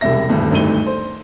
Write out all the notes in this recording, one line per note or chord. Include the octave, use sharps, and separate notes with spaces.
E1 C2 G3 D4 E5 A#6
D#1 D2 G2
G#1 D2 G2 A3 D#7 G7
C5